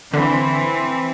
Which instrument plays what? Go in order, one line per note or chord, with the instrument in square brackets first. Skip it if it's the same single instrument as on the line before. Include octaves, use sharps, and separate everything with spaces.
[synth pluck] D3 [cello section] E3 C4